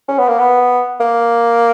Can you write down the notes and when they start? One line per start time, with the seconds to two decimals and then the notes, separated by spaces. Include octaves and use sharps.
0.08 C#4
0.19 B3
0.28 A#3
0.39 B3
1.00 A#3